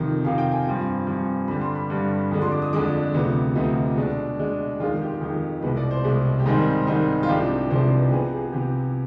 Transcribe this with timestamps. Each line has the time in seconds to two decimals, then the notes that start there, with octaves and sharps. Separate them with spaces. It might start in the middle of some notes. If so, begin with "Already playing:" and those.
Already playing: F2 C3 D#3
0.24 F2 C3 D#3 F5
0.38 G5
0.52 G#5
0.66 G2 F3 C4
1.07 G2 F3 C4
1.48 G2 D3 G3 D4 B5
1.61 C6
1.75 B5
1.90 G2 D3 G3 D4
2.31 F2 D3 G#3 D4
2.41 C6
2.52 D6
2.62 D#6
2.73 F2 D3 G#3 D4 D6
3.14 D2 C3 F3 B3
3.55 D2 C3 F3 B3 D#5
3.97 B2 G#3 D4
4.39 B2 G#3 D4
4.80 F2 D#3 G#3 F4
5.01 G4
5.21 F2 D#3 G#3
5.62 C2 B2 G#3 B4
5.77 D5
5.91 C5
6.04 C2 B2 G#3
6.40 G4
6.46 G#2 D#3 G3 C4 D#4 G#4
6.87 G#2 D#3 G3 C4 D#4
7.23 F4
7.28 C2 C3 F3 G#3 D4 G4
7.70 C2 C3 F3 G#3 D4 C5
7.84 C5
7.97 B4
8.11 C3 F3 B3 G#4
8.32 G#4
8.53 C3 F3 B3 G4